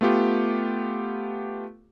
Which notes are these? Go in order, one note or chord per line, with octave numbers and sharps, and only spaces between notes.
A3 B3 F4 G4